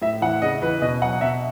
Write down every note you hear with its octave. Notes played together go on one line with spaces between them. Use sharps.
A2 E5
E3 F#5
C#3 D#5
E3 B4
B2 D#5
F#3 F#5
B2 E5